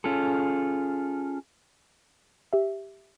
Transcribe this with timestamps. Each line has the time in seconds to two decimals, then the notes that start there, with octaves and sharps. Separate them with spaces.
0.04 C#4 F4 G#4 A4
2.53 G4 E5